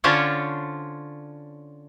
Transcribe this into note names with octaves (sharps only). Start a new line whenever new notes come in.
D3 C#4 D4 F4 C5 C#5